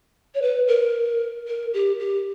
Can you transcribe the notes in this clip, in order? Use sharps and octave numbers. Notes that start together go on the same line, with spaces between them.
C#5
B4
A#4
A#4
G4
G4